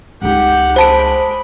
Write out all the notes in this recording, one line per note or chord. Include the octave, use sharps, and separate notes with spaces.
C#2 D#4 G4 F#5
G#3 C5 A5 B5 D7